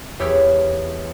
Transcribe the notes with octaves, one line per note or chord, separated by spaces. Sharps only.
E2 G4 C#5 E6 F6 G#6